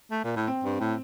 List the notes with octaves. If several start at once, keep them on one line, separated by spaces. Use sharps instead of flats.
A3
A#2
A2
C4
G2
A2